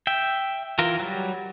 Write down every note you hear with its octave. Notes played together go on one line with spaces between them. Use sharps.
E5 G5
E3 F4 A#4
F#3 G3